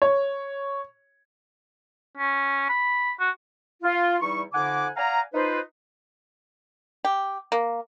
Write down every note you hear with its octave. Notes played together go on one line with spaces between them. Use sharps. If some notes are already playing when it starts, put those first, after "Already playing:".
C#5
C#4
B5
F#4
F4
E2 G3 D#4 E4 C#6
F2 D3 D#4 F#5 G#5 D6
D5 F5 F#5 G#5 A#5
D#4 F4 B4 C5
G4
A#3